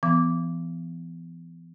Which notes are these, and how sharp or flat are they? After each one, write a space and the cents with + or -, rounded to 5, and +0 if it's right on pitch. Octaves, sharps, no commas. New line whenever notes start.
E3 +35 B3 +25 D6 -10